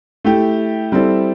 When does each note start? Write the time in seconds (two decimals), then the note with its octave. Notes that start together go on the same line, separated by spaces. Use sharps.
0.25 A3 E4 G4
0.92 G3 C4 E4 A4